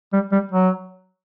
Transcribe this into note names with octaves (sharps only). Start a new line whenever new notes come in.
G3
G3
F#3